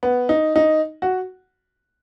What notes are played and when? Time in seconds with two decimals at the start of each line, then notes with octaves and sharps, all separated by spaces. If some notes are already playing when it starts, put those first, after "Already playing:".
0.03 B3
0.29 D#4
0.56 D#4
1.02 F#4